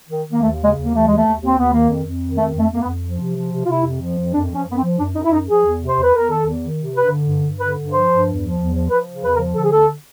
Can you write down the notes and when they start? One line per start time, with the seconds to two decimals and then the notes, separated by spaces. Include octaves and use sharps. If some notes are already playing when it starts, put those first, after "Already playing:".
0.09 D#3
0.26 D#3
0.33 A#3
0.42 D#2 A3
0.58 C#3
0.64 G#3
0.75 D#2
0.86 A#3
0.91 E3 A3
1.06 D#2 G#3
1.16 A3
1.24 D#2
1.41 D#2 C4
1.57 D#2 B3
1.73 D#3 A#3
1.89 F2
2.05 F2
2.22 D#3
2.38 F2 A3
2.54 F2
2.59 A3
2.71 F2 A#3
2.81 B3
2.87 F2
3.03 F3
3.19 C3
3.36 F3
3.52 C3
3.64 F4
3.68 C3 E4
3.85 F2
4.01 F3
4.18 F2
4.34 F#2 D4
4.50 F3 C#4
4.66 F#2 B3
4.77 C4
4.83 F3
4.99 F#2 D4
5.15 F#2 D#4
5.24 E4
5.32 F#2 D#4
5.48 F3 G#4
5.64 E2
5.81 C3
5.89 C5
5.97 E2
6.02 B4
6.13 E2 A#4
6.29 D#3 A4
6.45 E2
6.62 D#3
6.78 C3
6.95 G2 B4
7.11 D3
7.27 G2
7.44 G2
7.60 D3 B4
7.77 G2
7.92 F3 C5
8.09 G2
8.25 E2
8.42 F3
8.58 E2
8.74 F3
8.90 F3 B4
9.07 C#3
9.24 E2 B4
9.34 A#4
9.39 F3
9.55 D3 A4
9.63 G#4
9.71 D2 A4